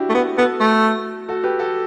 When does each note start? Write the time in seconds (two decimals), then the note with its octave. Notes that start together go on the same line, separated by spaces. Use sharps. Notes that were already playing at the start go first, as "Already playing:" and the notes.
Already playing: D4 E4 F#4 G4
0.10 A3
0.14 B3
0.37 B3 F#4 A4
0.60 A3
1.28 F#4 A4
1.44 G4 B4
1.59 F#4 A4